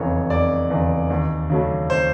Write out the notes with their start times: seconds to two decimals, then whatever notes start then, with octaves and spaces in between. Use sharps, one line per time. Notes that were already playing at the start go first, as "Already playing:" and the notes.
Already playing: F1 E2 C#3 C#5
0.30 F1 D5
0.71 E2 C#3
1.10 D#2
1.50 C#3 F#3 A3
1.90 C5